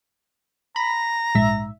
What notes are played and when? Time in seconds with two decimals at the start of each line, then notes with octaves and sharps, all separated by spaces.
0.76 A#5 B5
1.35 A#1 G#2 E5